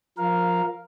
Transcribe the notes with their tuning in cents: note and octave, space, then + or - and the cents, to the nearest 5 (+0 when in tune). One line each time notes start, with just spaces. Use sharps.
F3 +15 A#4 +0 F5 +0